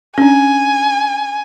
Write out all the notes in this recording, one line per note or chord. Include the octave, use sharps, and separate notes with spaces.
C#4 D4 G#5